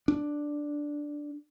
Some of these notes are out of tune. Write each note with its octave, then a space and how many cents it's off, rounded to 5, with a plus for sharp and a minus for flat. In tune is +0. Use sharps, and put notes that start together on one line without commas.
D4 +0